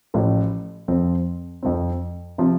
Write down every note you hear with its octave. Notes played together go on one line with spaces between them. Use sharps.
A1 A2 F3
F2 F3 C4
F2 F3 C4
C3 F3 C4